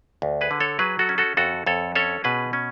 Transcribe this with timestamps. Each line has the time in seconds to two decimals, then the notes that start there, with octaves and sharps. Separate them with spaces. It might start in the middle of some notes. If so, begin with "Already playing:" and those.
0.22 D2
0.41 G#4 B4
0.51 D3
0.60 A4 C#5
0.79 F#3 G#4 B4
0.99 F#4 A4
1.09 C#4
1.18 F#4 A4
1.37 F2 F#4 A4
1.66 F2 A4 C#5
1.95 C#4 A4 C#5
2.24 B2 G#4 B4
2.53 C#4